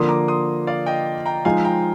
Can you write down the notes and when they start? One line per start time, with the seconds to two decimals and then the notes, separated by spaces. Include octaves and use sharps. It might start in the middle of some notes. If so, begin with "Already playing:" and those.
Already playing: D3 F3 A#3 C6 D#6
0.09 A#5 D6
0.28 C6 D#6
0.67 D5 F5
0.86 D#5 G5
1.26 G5 A#5
1.45 F3 G#3 D#4 F5 G#5
1.65 G5 A#5